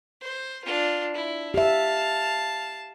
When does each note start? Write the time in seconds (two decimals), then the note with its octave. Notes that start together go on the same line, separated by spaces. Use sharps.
0.21 C5
0.65 D4 F4
1.15 E4
1.54 G4 E5 F5 A5